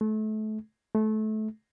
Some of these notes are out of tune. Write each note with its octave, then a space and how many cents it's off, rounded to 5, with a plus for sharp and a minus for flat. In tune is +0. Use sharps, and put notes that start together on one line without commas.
A3 -30
A3 -25